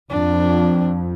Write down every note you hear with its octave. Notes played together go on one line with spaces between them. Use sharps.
F2 D4